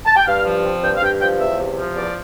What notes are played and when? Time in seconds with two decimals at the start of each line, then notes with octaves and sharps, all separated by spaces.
0.06 A5
0.17 G5
0.27 G2 F5
0.45 F3
0.64 C4
0.83 G2 G5
0.96 F5
1.02 G2 G5
1.20 F3 G5
1.40 E2 E5
1.59 C3
1.77 F3
1.96 E2 D5